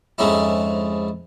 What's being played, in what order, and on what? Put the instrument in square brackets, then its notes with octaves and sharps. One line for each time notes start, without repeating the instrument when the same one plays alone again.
[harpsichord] F2 G#2 G#3 C#4 D#4 E4